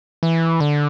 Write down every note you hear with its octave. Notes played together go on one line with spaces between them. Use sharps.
E3
D3